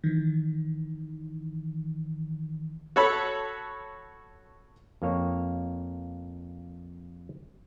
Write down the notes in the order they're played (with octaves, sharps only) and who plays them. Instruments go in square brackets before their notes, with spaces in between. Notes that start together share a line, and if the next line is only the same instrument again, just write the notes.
[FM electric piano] D#3 E3
[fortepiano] F#4 A4 C#5 A5 B5
[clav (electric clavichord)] F2 A#3 C#5